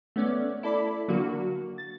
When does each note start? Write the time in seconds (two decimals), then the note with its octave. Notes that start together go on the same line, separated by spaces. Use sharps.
0.16 A3 B3 C#4 D5
0.63 E4 A4 D5 B5
1.08 D3 F#3 A#3 D4 F#4
1.78 A6